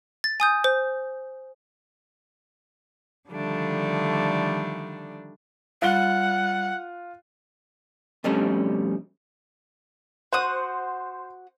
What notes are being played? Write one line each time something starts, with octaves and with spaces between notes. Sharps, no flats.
A6
G#5 D#6 G6
C5
D3 D#3 F3 G3 A3 D4
G3 F4 F#5 F#6 G7
F2 B2 G3 A3 C#4 D4
F#4 C5 F#5 D#6